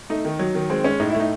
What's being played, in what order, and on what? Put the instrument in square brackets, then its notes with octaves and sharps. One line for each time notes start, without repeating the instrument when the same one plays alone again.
[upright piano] A3 D#4
D#3
F#3
D#3
G#3 C4
G#3 C#4
A2 D#4
A3 E4
D#4